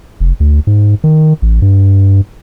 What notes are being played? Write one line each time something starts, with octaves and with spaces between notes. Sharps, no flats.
F1
D2
G#2
D#3
A1
G2